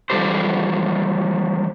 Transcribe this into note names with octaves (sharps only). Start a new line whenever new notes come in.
E3 F3 G3 G4 A4 C5